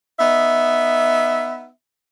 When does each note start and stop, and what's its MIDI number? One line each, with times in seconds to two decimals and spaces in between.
0.19 1.69 59
0.19 1.69 63
0.19 1.69 76